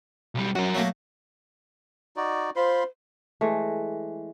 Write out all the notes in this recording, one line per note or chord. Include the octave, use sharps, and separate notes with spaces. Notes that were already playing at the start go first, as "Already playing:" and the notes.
B1 G3
F#2 F#4 A#4
F#3 A3 A#3
D#4 F#4 D5
F4 C5 B5 C6
E3 G#3 A3